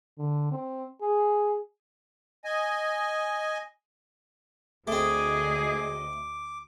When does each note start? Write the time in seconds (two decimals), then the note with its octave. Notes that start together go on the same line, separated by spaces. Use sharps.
0.18 D3
0.52 C4
1.02 G#4
2.45 D#5 G#5
4.88 D2 A3 C4 G#4 D#5 D6